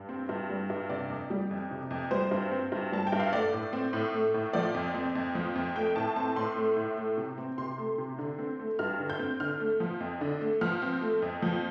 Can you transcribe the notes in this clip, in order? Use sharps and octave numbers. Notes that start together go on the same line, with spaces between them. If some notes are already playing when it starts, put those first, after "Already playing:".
Already playing: G2
C4
G2
G3
G2
C3 D5
F2
G3
F2
C3
F2
G3 C5
G2
C4
G2
G3 A5
G5
G2
F5
A3 D5
A2
C4
A2
A3
A2
F3 D5
F2
C4
F2
F3
F2
A3 G5
A2 A5
C4 A5
A2 C6
A3
A2
A3
C3
C4
C3 C6
A3
C3
D3
C4
A3
G2 F6
D3
G6
C4
D3 F6
A3
F3
F2
D3
A3
F3 F6
C4
A3
F2
F3